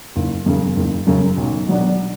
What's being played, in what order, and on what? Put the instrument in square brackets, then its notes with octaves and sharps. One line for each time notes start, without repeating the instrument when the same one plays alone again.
[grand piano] F#1
F#2 C#3
F#1
F#2 C#3
B1
B2 F#3 B3 D4